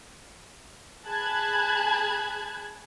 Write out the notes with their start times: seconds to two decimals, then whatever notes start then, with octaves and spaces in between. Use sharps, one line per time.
1.07 G#4 A5 B5 F#6 G#6